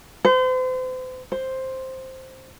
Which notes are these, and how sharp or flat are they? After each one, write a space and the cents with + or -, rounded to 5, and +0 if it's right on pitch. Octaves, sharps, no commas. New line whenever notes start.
C5 -40
C5 +5